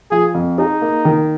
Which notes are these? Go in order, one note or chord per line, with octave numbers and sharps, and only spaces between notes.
F3 G#4
F2
D#4 G#4
A#3
D#3